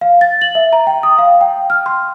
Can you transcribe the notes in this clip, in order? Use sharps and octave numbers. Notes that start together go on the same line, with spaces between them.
F5
A6
F#7
E5
A#5
G5
D#6
F5
G5
F6
C6